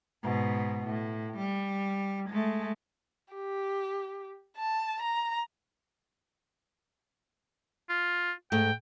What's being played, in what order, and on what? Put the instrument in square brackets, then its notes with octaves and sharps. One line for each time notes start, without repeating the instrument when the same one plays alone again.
[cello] G#2 B2
A2
G3
G#3 A3
[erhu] G4
A5
A#5
[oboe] F4
[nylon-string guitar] G#2 A3 [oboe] G5